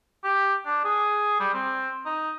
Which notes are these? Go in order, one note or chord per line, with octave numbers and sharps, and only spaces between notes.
G4
D4
G#4
G3
C4
D#4